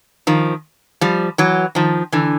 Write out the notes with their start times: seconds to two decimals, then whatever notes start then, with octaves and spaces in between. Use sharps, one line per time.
0.27 D#3 F3
1.01 F3 G3
1.38 E3 F#3
1.75 D#3 F3
2.12 D3 E3